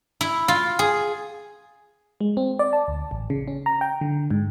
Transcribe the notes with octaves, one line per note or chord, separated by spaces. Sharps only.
E4
F4
G#4
G#3
C4
D5
A5
D2
A1
C#3
C#4
A#5
G5
D3
G#2